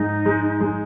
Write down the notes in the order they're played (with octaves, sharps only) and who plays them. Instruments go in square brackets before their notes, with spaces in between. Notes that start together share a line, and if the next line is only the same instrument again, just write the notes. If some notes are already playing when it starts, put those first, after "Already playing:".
Already playing: [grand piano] G#2 [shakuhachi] D#4
[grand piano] G#3
G#3